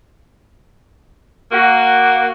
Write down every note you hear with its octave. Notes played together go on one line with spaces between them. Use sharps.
A#3 F#4